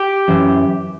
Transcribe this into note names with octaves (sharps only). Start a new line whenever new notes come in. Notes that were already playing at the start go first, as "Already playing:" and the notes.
Already playing: G4
F#2 E3